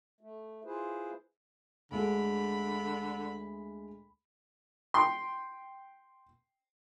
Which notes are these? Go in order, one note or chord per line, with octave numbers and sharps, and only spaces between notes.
A3
E4 F4 G#4 B4 C5
D2 D3 G#3 G#4 B5
G5 C6